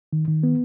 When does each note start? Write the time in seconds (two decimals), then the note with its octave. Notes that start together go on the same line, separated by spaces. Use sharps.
0.13 D#3
0.28 D#3
0.43 B3